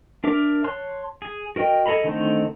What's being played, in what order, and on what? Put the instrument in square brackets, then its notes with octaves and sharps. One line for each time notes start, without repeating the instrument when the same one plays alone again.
[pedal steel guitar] D4 A#4 E5 D6
C#5 A5 C6 F#6
G#4
F#4 A#4 D#5 G5
G#4 A4 D#5 A#5 B5
D3 D#3 A3 C4 D#4